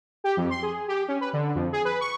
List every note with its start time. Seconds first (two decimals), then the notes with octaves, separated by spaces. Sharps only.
0.24 G4
0.37 F2
0.50 C6
0.62 G#4
0.88 G4
1.08 C#4
1.21 B4
1.33 D3
1.55 F2
1.72 G#4
1.85 B4
2.01 C#6